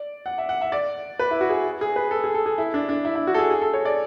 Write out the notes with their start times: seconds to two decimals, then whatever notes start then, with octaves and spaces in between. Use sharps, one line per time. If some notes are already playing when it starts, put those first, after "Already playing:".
Already playing: D5
0.26 F#5
0.38 E5
0.49 F#5
0.61 E5
0.72 D5
1.19 B4
1.31 E4
1.41 F#4
1.49 G#4
1.81 G#4
1.96 B4
2.11 A4
2.24 G#4
2.34 A4
2.46 G#4
2.58 E4
2.74 D4
2.89 D4
3.05 E4
3.15 E4
3.27 F#4
3.34 A4
3.38 G#4
3.50 G#4
3.62 A4
3.73 C#5
3.85 D5